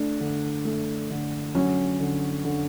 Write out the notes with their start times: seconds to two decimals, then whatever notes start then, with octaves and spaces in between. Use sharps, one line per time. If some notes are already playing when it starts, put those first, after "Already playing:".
Already playing: A3 D4
0.20 D3
0.65 A3
1.10 D3
1.55 F#3 C#4
2.00 D3
2.45 D3